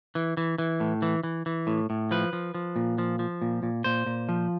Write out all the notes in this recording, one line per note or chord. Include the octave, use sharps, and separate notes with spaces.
E3
E3
E3
A2
E3
E3
E3
A2
A2
F3 B4
F3
F3
A#2
F3
F3
A#2
A#2
A#2 C5
A#2
F3